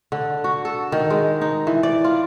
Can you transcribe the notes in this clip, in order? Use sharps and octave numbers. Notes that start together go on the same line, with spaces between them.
D3
F#4
A4
D#3
G#3
D#4
E3
D5
F4